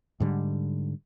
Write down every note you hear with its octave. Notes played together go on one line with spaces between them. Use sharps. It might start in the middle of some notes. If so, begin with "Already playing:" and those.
G#2 D3 G3